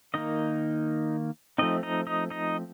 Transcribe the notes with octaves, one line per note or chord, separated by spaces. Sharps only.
D#3 A#3 D#4 D#5
F3 A3 C4 D#4 D#5
D#4 D#5
D#4 D#5
D#4 D#5